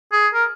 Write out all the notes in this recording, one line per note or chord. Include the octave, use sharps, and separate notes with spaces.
G#4
A#4